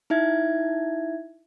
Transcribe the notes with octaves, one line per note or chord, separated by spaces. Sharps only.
D#4 E4 E5 G#6